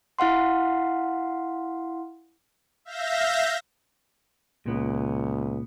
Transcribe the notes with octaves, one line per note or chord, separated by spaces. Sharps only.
E4 F5 F#5 C6
E5 F5 G6 A#6
C#2 A#2 B3